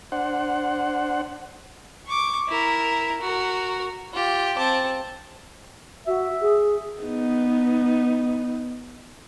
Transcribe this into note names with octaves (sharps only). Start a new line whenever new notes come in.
D4 C5 F#5
C#6 D6
E4 A#4
F#4 A#4
F4 G4
C4 A5
F#4 E5
G#4
B3 D#4